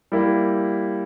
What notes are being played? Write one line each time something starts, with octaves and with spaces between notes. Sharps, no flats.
G3 A#3 E4